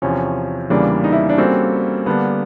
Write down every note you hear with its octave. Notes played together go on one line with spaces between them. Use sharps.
E2 C3 F3 C#4
E2 C#3 E3 G3 A#3 D4
D#4
E4
D4
G3 A#3 C4 C#4 F#4 A4
D3 G3 A#3 B3 D4